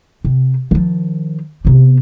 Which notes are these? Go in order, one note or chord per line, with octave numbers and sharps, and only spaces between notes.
C3
D#3 F3
C3 B3